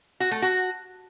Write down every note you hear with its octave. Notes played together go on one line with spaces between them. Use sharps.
F#4
A3
F#4